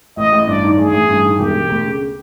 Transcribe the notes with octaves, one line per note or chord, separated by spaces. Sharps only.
A1 D#5
A1
G2 D5
D#3
A1 G#4
A1
G2
D#3
E1 G4
E1
D2
C#3